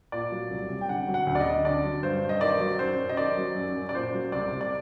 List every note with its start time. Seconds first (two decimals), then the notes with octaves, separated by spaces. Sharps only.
0.12 A#2 D5
0.32 F#3
0.51 C2
0.70 C2
0.81 G5
0.89 D3 F#5
1.08 F#3
1.14 F#5
1.27 D2
1.35 D5
1.40 D#5
1.46 D2
1.65 D3 D5
1.84 F#3
2.03 G2 C5
2.23 G2
2.29 D#5
2.41 D#3 D5
2.60 F#3
2.79 F#2 C5
2.99 F#2
3.09 D#5
3.17 D#3 D5
3.37 F#3
3.55 F#2
3.76 F#2
3.89 D5
3.94 A#2 C5
4.14 F#3
4.32 C2 D5
4.52 C2
4.61 D5